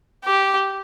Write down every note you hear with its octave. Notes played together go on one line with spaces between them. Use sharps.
G4